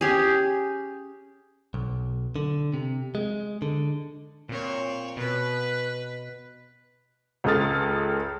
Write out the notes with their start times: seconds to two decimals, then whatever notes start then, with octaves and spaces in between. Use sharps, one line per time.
0.01 C#4 G4 G#4
1.74 B1
2.36 D3
2.74 C3
3.15 G#3
3.62 D3
4.49 A#2 C4 C#5
5.17 B2 B4
7.44 C#2 C#3 A4 D#6 F6 A6